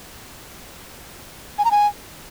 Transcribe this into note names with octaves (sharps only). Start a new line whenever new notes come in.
G#5
A#5
G#5